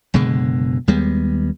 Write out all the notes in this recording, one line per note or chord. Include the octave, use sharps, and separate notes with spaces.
F#1 B2 D3 G#3
D#2 G3 G#3 B3